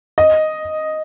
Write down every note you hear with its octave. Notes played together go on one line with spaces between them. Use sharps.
D#5